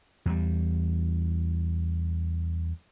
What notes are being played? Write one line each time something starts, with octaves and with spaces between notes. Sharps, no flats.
E2 G3